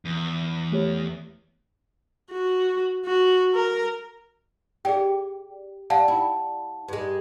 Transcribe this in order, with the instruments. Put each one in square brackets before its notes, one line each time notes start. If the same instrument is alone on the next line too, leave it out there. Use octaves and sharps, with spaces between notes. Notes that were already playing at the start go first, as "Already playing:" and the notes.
[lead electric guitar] E2
[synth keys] A3 G4 C#5
[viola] F#4
F#4
A#4
[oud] G4 [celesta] G#4 D5 G5
[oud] G3 [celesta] F5 F#5 A5
[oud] E4
G2 G#3